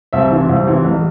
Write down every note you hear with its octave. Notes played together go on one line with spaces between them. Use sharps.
C2 E5
C3 E3
C2
C3 E3
A1